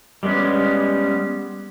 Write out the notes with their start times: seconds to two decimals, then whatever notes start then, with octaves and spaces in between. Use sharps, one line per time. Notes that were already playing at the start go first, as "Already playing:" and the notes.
0.23 G3 G#3 B3 C#4